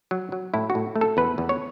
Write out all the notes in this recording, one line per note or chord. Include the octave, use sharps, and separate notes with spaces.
F#3
F#3
A2 E4
F#4
A2
A3
A4
E2 B4
E2
C#5